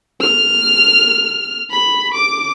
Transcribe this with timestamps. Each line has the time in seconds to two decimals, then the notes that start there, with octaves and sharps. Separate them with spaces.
0.21 F6
1.70 B5
2.14 D6